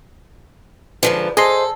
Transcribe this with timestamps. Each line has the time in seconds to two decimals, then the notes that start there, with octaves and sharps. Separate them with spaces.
1.03 G#2 D3 F3 B4
1.37 G#4 A4 C5 D#5 C6